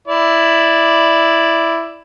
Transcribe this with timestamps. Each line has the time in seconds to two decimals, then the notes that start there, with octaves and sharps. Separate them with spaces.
0.08 E4 D5